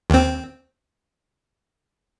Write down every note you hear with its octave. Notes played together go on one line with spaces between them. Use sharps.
D#2 C4